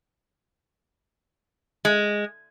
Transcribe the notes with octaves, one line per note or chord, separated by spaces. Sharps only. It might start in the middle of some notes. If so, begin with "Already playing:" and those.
G#3